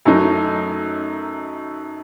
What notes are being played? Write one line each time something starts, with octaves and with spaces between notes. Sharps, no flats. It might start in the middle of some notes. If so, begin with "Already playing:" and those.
F#2 F#3 A3 D#4